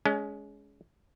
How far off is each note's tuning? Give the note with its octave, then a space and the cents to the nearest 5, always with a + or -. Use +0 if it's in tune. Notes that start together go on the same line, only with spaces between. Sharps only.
G#3 +10 C#4 +30